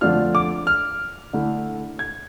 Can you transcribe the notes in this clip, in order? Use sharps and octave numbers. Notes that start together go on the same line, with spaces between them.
F2 D3 A3 D4 F4 F6
D6
F6
D3 A3 E4
G#6